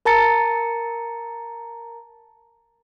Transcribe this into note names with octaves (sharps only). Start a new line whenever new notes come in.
A#4 A5 A#5 A6 C#7